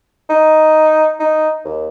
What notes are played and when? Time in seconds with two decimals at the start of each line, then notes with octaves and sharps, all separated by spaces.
0.30 D#4
1.20 D#4
1.65 D#2